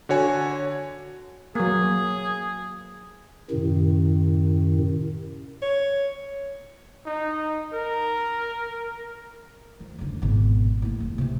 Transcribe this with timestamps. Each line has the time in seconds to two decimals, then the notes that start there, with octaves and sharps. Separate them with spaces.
0.09 D3 F#4 C#5 G#5
1.55 F#3 A#3 G#4
3.51 F#2 A2 C3 D#3
5.62 C#5
7.06 D#4
7.74 A#4
9.80 F3
9.99 F#2 D3
10.22 G#1 B2
10.82 A2 A#3
11.00 F1
11.18 C3 E3